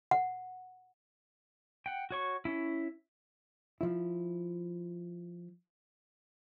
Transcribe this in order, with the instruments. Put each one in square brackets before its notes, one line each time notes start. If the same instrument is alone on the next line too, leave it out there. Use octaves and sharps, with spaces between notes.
[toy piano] F#5
[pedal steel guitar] F#5 G5
F#4 C#5 C#6
C#4 E4
[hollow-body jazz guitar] F3 E4